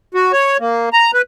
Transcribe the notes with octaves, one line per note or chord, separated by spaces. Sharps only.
F#4
C#5
A#3
A#5
B4